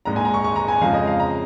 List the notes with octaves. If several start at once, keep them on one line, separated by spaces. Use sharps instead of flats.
A#1 G#2 G#3 A#5
G#5
A#5
C#6
C#6
A#5
G#5
F2 C#3 F3 G#3 F5
D#5
F5
A#5